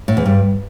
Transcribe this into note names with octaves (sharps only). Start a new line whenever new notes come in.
A2
E2
G2